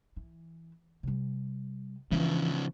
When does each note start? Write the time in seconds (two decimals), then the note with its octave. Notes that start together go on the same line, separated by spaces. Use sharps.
0.16 E3
1.03 C3 G3
2.11 C#3 E3 F3 D4